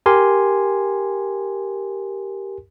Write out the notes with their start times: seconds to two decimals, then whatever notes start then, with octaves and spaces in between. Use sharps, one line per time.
0.06 G4 A#4 G#5 C6